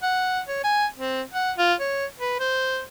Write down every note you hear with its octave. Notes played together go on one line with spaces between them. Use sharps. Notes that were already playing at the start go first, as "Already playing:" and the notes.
F#5
C#5
G#5
C4
F#5
F4
C#5
B4
C5